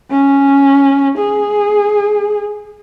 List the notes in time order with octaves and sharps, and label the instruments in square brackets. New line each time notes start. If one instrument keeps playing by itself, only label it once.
[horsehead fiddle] C#4
G#4